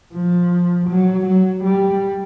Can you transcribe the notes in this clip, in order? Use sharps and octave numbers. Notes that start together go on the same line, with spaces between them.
F3
F#3
F#3
G3